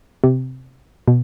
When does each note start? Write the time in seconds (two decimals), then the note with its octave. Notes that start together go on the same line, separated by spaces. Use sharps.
0.24 C3
1.08 B2